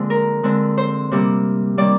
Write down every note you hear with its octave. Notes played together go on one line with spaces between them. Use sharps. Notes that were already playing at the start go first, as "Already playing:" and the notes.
Already playing: D3 F3 G#3 A#3 C4
A#4
D3 G#3 C4
C5
C3 G3 A#3
D#3 G3 A#3 D5